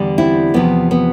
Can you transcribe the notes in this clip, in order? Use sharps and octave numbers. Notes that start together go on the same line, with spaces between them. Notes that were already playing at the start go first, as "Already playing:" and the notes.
Already playing: E2 D3 G3
C4 E4
E2 C3 F3 B3
B3